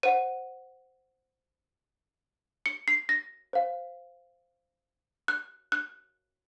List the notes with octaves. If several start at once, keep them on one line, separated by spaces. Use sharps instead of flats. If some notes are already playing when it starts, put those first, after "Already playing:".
C5 F#5 D#7
C#7
C7
A#6
C5 F5
F#6
F#6